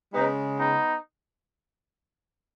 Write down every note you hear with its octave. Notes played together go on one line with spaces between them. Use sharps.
C#3 G#3 B3 D#4
B3 D#4